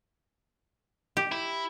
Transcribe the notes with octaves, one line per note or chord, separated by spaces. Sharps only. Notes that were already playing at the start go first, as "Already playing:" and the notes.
G4
E4